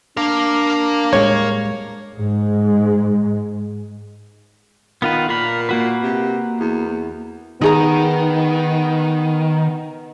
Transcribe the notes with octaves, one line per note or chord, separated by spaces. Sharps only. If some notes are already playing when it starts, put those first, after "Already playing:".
D4 A#4 F5
A2 G3 G#3 C#5
G#2 G#3
D#3 B3 F4 B4
A#2 A#4 B5
A#3 F#4 B4
C3
E2
D#3 B3 D#4 G#4 A#5